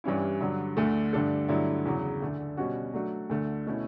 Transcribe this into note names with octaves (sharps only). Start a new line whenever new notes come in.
G2 E3 G3 C#4 E4
G2 D3 F#3
D2 D3 A3
G2 D3 A3 D4 A4
G2 D3 F#3 A3 E4
E2 C#3 F#3
D2 D3 A3
B2 G3 C#4 F#4
F#3 A3 D4 F#4
D2 D3 A3
B2 A3 C#4 E4